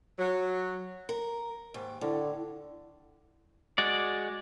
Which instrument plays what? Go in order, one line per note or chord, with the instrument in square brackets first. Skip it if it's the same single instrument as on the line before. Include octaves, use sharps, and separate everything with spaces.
[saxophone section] F#3
[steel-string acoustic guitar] A#4
D#2 G#2 G4
[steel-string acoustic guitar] A2 [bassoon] D3
[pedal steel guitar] G#3 F#4 D5